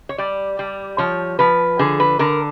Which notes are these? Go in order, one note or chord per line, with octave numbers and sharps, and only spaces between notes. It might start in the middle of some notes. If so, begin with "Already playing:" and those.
C#5
G3 D5
G3
F3 C#5
F3 B4
D3 G#4
B4
D3 A#4